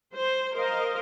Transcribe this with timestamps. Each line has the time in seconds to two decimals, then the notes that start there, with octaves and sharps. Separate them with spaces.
0.13 C5
0.54 A#4 C5 D#5 F5